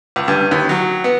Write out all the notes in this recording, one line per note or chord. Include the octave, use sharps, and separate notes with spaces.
C#2
G2
D#2
F#3
B3